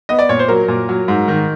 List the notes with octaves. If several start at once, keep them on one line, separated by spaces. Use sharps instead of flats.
B3 D#5
D5
A#2 C#5
C5
F#3 A#4
A#2
F#3
G#2
D#3